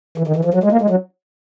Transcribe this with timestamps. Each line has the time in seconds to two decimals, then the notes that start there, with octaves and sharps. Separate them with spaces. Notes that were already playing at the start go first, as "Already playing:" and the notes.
0.18 E3
0.27 D#3
0.36 E3
0.45 F3
0.54 F#3
0.64 G#3
0.72 A#3
0.81 G#3
0.90 F#3